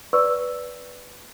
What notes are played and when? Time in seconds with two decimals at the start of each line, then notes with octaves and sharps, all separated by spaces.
0.13 B4 D5 C#6 E6